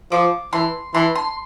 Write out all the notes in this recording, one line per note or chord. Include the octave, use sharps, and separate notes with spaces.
F3 D6
E3 C6
E3 C6
C6